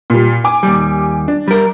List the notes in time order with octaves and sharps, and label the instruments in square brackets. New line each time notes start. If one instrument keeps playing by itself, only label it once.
[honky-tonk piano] A#2 G3
G#5 D6
[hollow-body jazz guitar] D#2 G3
[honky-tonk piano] D4
[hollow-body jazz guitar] G3 A#4